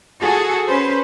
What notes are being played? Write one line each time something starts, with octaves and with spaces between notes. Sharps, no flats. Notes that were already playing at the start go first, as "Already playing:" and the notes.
F#4 G#4 A4
C#4 B4 C5